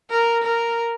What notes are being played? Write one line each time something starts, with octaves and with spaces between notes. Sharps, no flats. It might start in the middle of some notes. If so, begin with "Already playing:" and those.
A#4
A#4